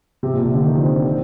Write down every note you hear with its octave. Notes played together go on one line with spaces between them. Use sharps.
C3
A#2
C3
D3
D#3
F3
C4
D4
C4